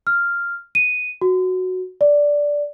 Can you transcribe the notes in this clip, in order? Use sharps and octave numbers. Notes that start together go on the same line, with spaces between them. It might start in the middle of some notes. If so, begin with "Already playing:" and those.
F6
D#7
F#4
D5